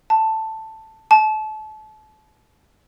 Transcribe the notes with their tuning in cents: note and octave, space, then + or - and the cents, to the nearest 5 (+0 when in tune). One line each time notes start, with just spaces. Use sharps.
A5 +5
A5 -30